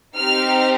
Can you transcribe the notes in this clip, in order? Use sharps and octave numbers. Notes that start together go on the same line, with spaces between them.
C4 D#4 G4 F6